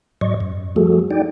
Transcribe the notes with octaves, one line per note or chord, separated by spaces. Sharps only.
G#2 F#3 D5 D#5 C#6
F#2
F3 G3 A3 F#4 G#4 A4
D#4 D5 G5